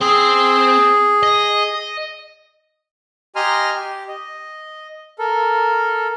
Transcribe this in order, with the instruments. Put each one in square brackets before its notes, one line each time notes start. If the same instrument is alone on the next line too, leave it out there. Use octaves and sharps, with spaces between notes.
[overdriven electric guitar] C4 [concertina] G#4
[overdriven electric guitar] D#5
[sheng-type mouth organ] G4 D#5 G#5 A#5 C6 F6
G4
D#5
A4 A#4